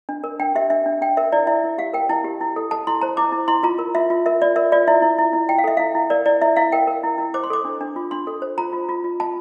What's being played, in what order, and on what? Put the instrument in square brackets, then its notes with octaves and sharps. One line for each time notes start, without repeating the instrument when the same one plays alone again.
[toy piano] D4
A#4
D4 G5
G4 E5
D4 E5
D4
D4 G5
A#4 E5
E4 D5
E4 E5
E4
G4 F5
A#4 G5
E4 A5
G4
E4
A4
A4 A5
E4 C6
C5 A#5
E4 D6
E4
E4 C6
F4 A#5
A#4
F4 E5
F4
A#4 E5
F4 D5
A#4 E5
F4 D5
E4 E5
E4
E4
E4
E4 G5
F5
A4 E5
E4 F5
E4
A#4 D5
E4 D5
E4 E5
E4 F5
A#4 G5
A#4
E4
E4
C5 D6
C6
A4 D6
D4
D4
F4
D4 C6
A4
C5
F4 A#5
F4
F4
F4
F4 A5